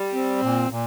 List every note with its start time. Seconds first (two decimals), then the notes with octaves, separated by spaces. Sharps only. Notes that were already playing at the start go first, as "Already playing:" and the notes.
Already playing: G3
0.14 C4
0.42 A#2
0.70 A#2